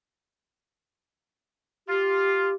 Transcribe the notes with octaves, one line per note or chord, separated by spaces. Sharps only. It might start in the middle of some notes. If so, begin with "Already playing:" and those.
F4 G4